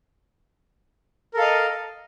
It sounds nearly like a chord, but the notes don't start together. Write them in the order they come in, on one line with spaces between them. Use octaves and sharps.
A#4 A4 F5 D#5